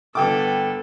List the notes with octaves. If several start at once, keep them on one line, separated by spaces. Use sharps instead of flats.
G1 B3 A4 G5 D6